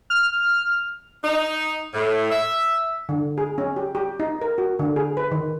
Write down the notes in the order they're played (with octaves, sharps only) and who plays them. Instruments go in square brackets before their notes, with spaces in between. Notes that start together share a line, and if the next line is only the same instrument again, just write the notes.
[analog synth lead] F6
[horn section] D#4
A2
E5
[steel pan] D3
G#4
C#4
G4
G4
D#4
A#4
F#4
D3
G#4
B4
D#3